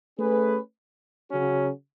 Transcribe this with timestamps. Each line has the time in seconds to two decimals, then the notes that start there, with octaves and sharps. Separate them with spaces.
0.19 A3 C#4 G#4 B4
1.30 C#3 F#3 C#4 F#4